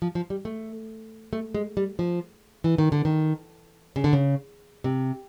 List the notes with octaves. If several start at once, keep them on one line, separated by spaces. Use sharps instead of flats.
F3
F3
G3
A3
A3
G#3
G3
F3
E3
D#3
D3
D#3
C#3
D3
C#3
C3